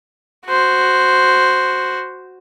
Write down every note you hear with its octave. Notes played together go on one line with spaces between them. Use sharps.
F#4 C5